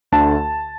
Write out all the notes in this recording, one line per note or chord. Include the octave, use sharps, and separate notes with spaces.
D2 D3 A3 A5